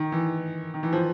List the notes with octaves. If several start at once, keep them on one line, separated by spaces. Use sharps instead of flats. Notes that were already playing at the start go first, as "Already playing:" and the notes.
Already playing: D#3
E3
D#3
E3
F3